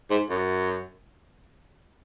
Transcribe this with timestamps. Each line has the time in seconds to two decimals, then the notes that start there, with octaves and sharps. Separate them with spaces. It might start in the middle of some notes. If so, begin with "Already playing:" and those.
0.11 G#2
0.30 F#2